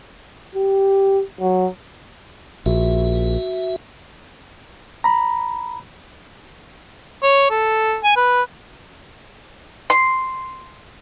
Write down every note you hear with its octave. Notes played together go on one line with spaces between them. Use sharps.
G4
F#3
A#1 F#4 E5
A#5 B5
C#5
A4
G#5
B4
C6